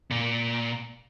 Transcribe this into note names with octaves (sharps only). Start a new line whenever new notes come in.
A#2